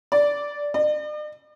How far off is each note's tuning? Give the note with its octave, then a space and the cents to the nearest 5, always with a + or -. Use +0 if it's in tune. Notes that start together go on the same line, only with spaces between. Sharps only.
D5 -10
D5 +45